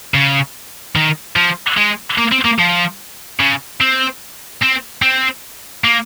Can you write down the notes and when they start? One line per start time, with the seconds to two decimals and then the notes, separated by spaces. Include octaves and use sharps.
0.14 C#3
0.96 D#3
1.36 F3
1.77 G#3
2.18 A#3
2.32 C4
2.45 A#3
2.59 F3
3.40 C#3
3.81 C4
4.62 C4
5.02 C4
5.84 A#3